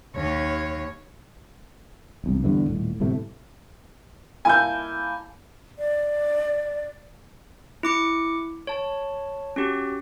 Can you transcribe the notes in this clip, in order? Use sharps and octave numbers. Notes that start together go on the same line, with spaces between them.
D#2 C#5
E1 C2
E2 G2 D3 E3
D#1 A2
G1 A2 C3 A3
A#3 E4 A4 G#5 G6
D5
E4 D6 C#7
C#5 A5
C#4 F#4 G4